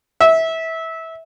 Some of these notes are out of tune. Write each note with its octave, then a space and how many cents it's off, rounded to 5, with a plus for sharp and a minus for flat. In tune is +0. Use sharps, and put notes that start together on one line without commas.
E5 -20